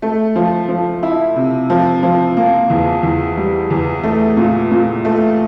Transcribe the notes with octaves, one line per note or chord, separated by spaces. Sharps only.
A3
F3
F3
E4
C3
F3
F3
A#3
E2
E2
G3
E2
A3
A#2
A#2
A3